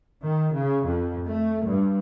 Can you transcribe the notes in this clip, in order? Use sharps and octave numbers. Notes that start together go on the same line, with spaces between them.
D#3
C#3
F2
A3
G2